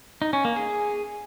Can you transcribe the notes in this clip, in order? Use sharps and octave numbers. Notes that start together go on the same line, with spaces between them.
D#4
C#4
A#3
G#4